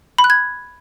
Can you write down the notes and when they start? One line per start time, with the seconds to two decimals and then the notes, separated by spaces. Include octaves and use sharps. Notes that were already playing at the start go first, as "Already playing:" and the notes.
0.18 B5
0.24 F#6
0.30 G#6